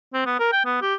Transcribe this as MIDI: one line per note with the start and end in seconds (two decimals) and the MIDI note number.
0.13 0.23 60
0.26 0.35 59
0.39 0.50 70
0.52 0.61 79
0.65 0.77 59
0.82 0.95 67